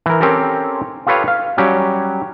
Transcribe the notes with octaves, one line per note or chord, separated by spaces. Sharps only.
E3 A#4
C4 C#4 G4 A4 A#4
F4 G4 A4 B4 C#5 F5
F5
F#3 G3 C#4 G4